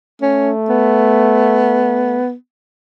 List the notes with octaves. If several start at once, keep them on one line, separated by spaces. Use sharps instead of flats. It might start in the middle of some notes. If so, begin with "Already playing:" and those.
A3 C#4
B3